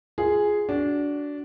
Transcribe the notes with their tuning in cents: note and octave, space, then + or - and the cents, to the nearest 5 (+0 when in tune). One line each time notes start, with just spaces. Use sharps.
F4 -10 G#4 +0
D4 -15 F#4 +10